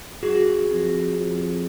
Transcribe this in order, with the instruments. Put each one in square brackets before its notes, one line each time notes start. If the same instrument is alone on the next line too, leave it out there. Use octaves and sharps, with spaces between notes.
[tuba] F#2 [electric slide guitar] F#4 G#4
[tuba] F2
F2